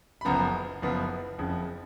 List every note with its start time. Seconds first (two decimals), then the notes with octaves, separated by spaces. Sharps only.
0.21 B5
0.25 F#1 F#2 F3 B3 A#5
0.82 F#1 F#2 F3 B3
1.38 F#1 F2 C#3 F3